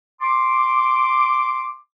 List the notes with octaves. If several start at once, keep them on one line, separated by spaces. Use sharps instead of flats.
C6 D6